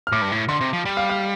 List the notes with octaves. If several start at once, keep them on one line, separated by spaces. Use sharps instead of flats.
F6
A2 D6
G2
A2
D3 C6
C3
F3
G3
F5
F5